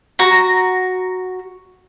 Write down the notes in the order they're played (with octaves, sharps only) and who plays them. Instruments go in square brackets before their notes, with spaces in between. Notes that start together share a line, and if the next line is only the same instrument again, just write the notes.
[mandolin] F#4 A#5